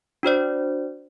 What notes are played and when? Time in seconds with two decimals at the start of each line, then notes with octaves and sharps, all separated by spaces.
0.23 D4 F#4 C5 D5